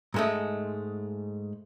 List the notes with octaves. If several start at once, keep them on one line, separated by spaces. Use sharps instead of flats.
G#2 G#3 A3